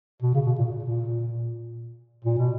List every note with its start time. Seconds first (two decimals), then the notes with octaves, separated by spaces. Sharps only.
0.22 B2
0.34 C#3
0.46 B2
0.59 A#2
0.70 A#2
0.83 A#2
2.25 A#2
2.38 B2